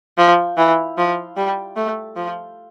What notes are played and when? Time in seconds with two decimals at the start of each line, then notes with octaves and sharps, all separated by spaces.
0.18 F3
0.57 E3
0.98 F3
1.37 G3
1.76 A3
2.16 F3